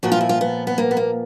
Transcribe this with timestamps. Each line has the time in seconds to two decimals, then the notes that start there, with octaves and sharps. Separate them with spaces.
0.03 A#2 F3 F#4
0.12 F4
0.21 E4
0.29 F4
0.41 B3
0.67 B3
0.78 A#3
0.91 B3
0.97 A#3